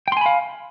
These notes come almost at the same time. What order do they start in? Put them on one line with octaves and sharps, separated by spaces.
G5 C6 G#5 B5 F5